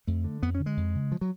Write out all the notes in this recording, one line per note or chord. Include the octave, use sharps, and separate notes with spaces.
F2 A3
D3
F2 B3
D3 C#4
G#3
F2
C#3
F3
F#3